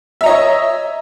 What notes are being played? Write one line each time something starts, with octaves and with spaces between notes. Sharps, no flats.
C#5 D#5 E5 A#5